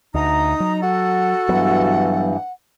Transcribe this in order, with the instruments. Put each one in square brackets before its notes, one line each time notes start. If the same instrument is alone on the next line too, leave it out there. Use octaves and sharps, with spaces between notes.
[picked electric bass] D2 [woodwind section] D#4 A#5 [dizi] D#6
[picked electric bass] F#3
[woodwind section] F#4 A4 [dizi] F#5
[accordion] G2 E3 [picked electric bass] F#3 B3